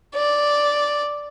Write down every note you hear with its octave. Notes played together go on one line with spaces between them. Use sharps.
D5